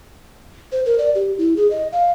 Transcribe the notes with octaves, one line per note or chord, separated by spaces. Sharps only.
C5
A#4
D5
G4
E4
G#4
D#5
F5